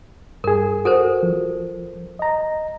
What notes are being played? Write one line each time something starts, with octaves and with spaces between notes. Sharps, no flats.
G2 G#4 A#4
F#4 A4 A#4 C5
F3
D#5 A#5